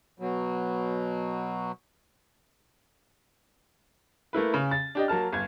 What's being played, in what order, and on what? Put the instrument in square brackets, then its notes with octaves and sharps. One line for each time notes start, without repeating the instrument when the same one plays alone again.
[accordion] B2 F#3
[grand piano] A3 A#3 E4 B4
C#3
A6
D4 G4 D#5
F#3 A#3 A5 F6
G1 G#6